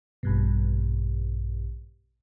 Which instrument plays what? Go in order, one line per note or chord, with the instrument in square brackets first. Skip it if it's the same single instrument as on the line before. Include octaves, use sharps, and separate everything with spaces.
[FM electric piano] A#1 G2 B2